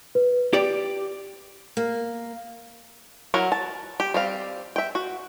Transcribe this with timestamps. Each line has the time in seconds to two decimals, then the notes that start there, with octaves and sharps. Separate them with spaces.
0.15 B4
0.53 G4 D5
1.77 A#3
3.34 F#3 E4 A#4 F#5
3.52 A5
4.00 G4
4.14 G3 C4 F5
4.76 E5 G5
4.95 F#4